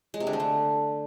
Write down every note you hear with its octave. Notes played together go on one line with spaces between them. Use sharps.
G#3
C3
D3
A3
D3